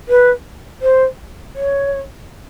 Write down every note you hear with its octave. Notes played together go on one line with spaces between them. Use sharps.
B4
C5
C#5